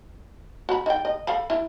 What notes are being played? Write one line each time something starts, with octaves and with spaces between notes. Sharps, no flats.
F#4 B5
D#4 G5
D#5
A4 F5 B5
E4